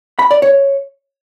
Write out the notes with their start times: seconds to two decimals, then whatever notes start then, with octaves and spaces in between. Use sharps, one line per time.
0.19 B5
0.31 D5
0.42 C#5